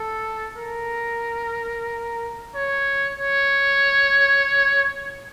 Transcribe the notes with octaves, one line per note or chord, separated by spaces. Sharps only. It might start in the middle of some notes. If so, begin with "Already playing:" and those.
Already playing: A4
A#4
C#5
C#5